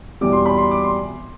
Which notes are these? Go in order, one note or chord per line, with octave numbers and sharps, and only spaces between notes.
E2 B2 G3 D6
C6
B5
C6
D6
C6